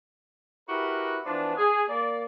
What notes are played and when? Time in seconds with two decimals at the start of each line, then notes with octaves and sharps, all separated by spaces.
0.69 E4 F#4 G4 A#4 B4
1.26 E3 F3 B3 D4
1.56 G#4
1.88 A#3 D5